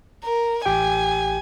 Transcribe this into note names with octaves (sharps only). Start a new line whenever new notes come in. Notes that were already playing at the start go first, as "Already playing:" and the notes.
A#4
A1 G4 G5 G#5